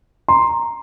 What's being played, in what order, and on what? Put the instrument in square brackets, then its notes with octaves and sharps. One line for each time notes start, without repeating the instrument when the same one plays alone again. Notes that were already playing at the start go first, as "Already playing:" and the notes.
[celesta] A#5 [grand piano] C6